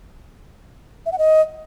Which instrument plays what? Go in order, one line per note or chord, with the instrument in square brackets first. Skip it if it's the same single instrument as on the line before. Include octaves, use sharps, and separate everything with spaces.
[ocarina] E5
F#5
D#5